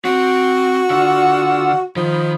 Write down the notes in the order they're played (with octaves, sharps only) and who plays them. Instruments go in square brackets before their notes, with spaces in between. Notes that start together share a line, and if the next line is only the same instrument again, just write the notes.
[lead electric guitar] C4 [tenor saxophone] F#4
[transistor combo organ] D3 F4 E6 [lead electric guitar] F#5
[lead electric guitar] D#3 [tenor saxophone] F3 [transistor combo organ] D#4 B5